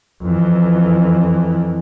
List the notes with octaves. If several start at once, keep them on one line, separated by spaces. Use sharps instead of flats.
F2 E3